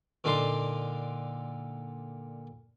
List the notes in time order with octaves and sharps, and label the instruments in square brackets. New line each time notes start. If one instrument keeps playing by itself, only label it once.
[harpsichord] A#2 D3 D4 D#4 A5 C6